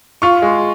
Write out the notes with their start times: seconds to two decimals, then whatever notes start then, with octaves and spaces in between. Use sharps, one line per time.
0.22 F4 C#6
0.42 G#3